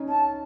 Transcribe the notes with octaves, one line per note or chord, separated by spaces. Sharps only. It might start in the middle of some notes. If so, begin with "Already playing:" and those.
Already playing: C#4 D#4
A5